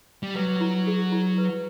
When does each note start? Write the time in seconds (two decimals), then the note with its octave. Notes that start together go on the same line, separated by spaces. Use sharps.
0.23 G3
0.35 F#3 B4
0.61 E4
0.87 G#4
1.12 E4
1.38 B4